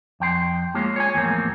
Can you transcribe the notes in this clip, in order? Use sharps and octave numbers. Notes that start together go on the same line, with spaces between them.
F2 G5 C6
G#3 A#3 F4 C#5
C#5 G#5
E2 A2 F3 A#3 C4